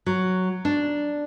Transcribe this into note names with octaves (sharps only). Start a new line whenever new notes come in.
F#3
D4